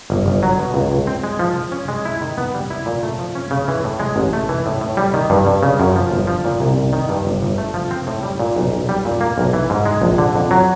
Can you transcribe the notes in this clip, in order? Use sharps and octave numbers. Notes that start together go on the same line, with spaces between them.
G1
G1
F#3
B2
C#2
C#2
C4
G#3
F3
F3
C#4
G#3
E4
D#3
B3
G3
E4
A#2
A3
F3
C#4
C#3
E3
A2
G#3
A1
A3
E3
A2
A2
G3
D#3
G2
G2
C#3
F#2
F3
G1
F3
A#2
C2
C2
D#3
G2
G1
G1
A3
F3
C4
A2
G3
A#2
B1
B1
G3
A#2
A#3
B1
E3
G#2
G#3
A#1
D3
F2
F#3